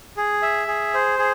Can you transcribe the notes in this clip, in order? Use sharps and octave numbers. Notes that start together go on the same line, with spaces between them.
G#4
E5
G#4
C5
G#4